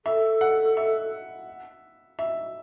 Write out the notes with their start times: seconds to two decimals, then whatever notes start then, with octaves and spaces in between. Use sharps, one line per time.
0.05 A4 E5
0.41 F#5
0.77 E5
2.19 E5